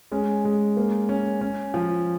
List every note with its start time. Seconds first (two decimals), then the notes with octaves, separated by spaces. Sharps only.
0.12 G#3 C#4
0.45 G#3
0.77 A#3
1.09 C#4
1.41 C#4
1.74 F3